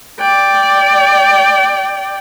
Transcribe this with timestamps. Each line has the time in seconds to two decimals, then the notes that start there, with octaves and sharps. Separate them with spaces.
0.20 D5 G5